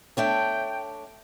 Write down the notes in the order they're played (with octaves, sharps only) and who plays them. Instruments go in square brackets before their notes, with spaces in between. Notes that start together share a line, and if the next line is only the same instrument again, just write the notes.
[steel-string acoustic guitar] A3 D4 C#5 [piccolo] G5